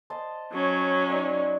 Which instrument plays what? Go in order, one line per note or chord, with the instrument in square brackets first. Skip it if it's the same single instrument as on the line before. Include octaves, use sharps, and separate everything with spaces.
[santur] C5 D#5 A5
[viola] F#3 C#4
[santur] D#4 D5 D#5